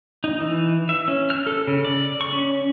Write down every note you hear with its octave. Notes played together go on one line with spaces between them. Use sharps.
D#4
E3
E5
C#4
F6
A4
C#3
D5
C#6
C#4